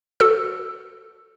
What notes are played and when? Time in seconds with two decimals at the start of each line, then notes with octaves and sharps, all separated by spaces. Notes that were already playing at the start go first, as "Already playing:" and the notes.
0.20 F#4 A4 E6